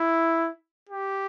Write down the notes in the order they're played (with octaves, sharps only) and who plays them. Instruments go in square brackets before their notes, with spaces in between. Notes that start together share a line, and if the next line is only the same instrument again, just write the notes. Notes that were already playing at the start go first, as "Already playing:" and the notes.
Already playing: [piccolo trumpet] E4
G4